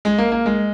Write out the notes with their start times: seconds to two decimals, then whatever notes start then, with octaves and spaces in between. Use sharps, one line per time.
0.05 G#3
0.18 A#3
0.32 A#3
0.46 G#3